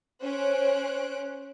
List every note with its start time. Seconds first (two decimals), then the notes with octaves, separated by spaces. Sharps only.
0.23 C#4 C5 C#5 F#6 D7